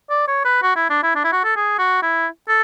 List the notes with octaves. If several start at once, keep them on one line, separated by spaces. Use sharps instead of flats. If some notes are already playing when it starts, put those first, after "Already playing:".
D5
C#5
B4
F#4
E4
D4
E4
D4
E4
F#4
A4
G#4
F#4
E4
A4